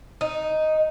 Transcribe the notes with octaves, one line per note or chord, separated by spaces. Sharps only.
D#4